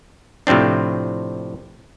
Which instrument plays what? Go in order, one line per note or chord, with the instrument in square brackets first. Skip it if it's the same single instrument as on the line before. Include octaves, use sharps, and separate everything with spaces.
[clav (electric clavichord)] A2 C3 F3 C4 D4